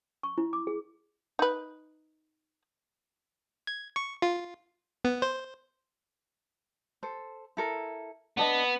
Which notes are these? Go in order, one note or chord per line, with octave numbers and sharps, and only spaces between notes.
C#6
E4
D6
G#4
D#4 B4
G#6
C#6
F4
B3
C5
A4 C5
E4 A4 A#4
B3 D4 A4 D#5